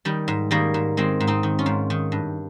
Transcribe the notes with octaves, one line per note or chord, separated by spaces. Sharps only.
D#3 G3
G#2
D#3 G3 A#3
G#2
D#3 G#3 C4
G#2
C4 D#4
D#3
C#4 F4
G#2
D#3
G2